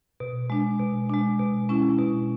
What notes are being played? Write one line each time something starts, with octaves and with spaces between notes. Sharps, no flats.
B2
G#3 D4
B2
G#3 D4
B2
G#3 C#4 E4
B2